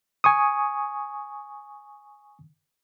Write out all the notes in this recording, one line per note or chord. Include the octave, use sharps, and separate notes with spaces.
G#5 C#6 D#6